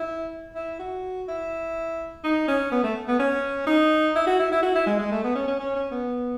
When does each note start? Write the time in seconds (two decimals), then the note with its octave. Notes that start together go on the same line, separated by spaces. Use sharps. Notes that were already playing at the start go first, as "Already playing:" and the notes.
Already playing: E4
0.55 E4
0.79 F#4
1.28 E4
2.24 D#4
2.48 C#4
2.71 B3
2.83 A3
3.08 B3
3.19 C#4
3.67 D#4
4.15 E4
4.27 F#4
4.39 E4
4.52 E4
4.63 F#4
4.75 E4
4.87 G#3
4.99 G#3
5.11 A3
5.24 B3
5.35 C#4
5.47 C#4
5.60 C#4
5.76 C#4
5.91 B3